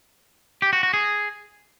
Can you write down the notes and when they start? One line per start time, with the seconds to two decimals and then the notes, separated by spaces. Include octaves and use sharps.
0.62 G4
0.73 F#4
0.83 F#4
0.94 G#4